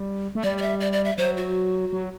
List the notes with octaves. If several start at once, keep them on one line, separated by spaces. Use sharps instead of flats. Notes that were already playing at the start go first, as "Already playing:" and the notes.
Already playing: G3
A3
G3 D5
D5
E5
D5
D5
E5
F#3 C5
F#4
F#3